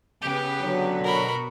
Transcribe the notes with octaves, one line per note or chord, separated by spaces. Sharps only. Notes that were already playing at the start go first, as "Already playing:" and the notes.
C#3 B3 G4 B4
D3 F#3
B2 F#4 A#4 B5